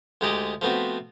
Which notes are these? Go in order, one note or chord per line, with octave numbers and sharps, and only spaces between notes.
D2 G#3 D#4 G4 D5 D#5
F3 A3 B3 C4 F#4